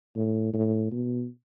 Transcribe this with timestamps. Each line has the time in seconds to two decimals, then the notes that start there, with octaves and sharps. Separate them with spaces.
0.15 A2
0.53 A2
0.92 B2